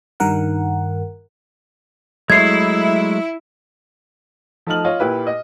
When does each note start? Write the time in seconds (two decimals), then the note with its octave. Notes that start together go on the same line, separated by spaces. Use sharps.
0.20 G2 D#3 A#4 F#5
2.30 F#3 G#3 A3 E4 G#6 C7
4.67 F3 A3 D#4 A5 F6 F#7
4.85 F4 C#5 D#5
5.00 A#2 E4 G4 B4
5.27 D#5